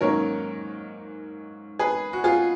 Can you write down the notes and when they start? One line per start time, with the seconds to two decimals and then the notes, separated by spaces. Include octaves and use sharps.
0.01 G#2 D#3 F#3 A#3 C#4 A#4 C#5
1.79 G#4 B4
2.13 F#4
2.24 F4 G#4